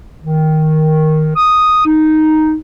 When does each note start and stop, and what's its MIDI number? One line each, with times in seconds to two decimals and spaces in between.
0.23 1.30 51
1.35 1.82 87
1.85 2.55 63